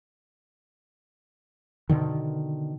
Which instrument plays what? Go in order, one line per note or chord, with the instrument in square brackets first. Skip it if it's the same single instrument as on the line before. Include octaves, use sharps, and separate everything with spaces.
[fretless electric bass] B2 D3 D#3